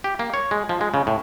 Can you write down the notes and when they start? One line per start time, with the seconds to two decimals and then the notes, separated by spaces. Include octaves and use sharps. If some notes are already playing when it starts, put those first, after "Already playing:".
0.04 G4
0.19 A#3
0.34 C#5
0.51 G#3
0.69 F3
0.81 G#3
0.94 C#3
1.07 A2